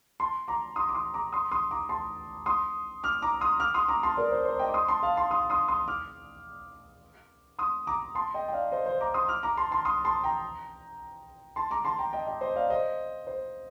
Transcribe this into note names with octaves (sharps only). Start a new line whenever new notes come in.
A5 C6
A#5 D6
C6 D#6
D6
C6 D#6
A#5 D6
C6 D#6
C6 D#6
A#5 D6
A5 C6
C6 D#6
D6 F6
A#5 D6
C6 D#6
D6 F6
C6 D#6
A#5 D6
A5 C6
A#4 D5
C5
C5
D#5 G5
D6
C6 D#6
A5 C6
F5 A5
A5 C6
C6 D#6
C6 D#6
C6 D#6
D6 F6
C6 D#6
A#5 D6
A5 C6
D#5 G5
G5
D5 F5
C5 D#5
C5 D#5
A#5 D6
C6 D#6
D6 F6
A#5 D6
A5 C6
A5 C6
C6 D#6
A5 C6
G5 A#5
A5 C6
A#5 D6
A5 C6
G5 A#5
D#5 G5
D#5 G5
C5 D#5
D5 F5
C5 D#5
C5